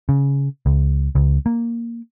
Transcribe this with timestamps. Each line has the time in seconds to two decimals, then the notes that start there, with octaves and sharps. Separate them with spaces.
0.09 C#3
0.66 C#2
1.15 C#2
1.46 A#3